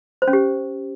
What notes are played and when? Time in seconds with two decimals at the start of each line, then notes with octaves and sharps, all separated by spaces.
0.22 C5
0.28 C#4
0.33 G4